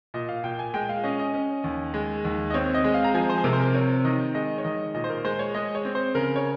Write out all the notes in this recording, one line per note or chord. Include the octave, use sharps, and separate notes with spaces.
A#2 D#5
F5
A#2 G5
G#5
G#3 G5
F5
C#4 D#5
D#5
C#4
D#2
G#3
D#2
D#5
C4 C#5
D#5
G#3
F5
A#5
F3 G#5
C5
G#4
C3 A#4
C5
A#4
C4 C#5
D#3 D#5
G#3 D#5
C#5
D#3 D#5
A#2 D#5
C5
A#4
G#3 C5
C#5
G#3 D#5
C#5
C4
C5
C#3 A#4
C#5